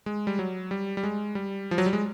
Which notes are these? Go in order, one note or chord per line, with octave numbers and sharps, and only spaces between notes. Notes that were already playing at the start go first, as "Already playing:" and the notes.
G#3
G3
F#3
G3
G3
G#3
G3
F3
F#3
G3
G#3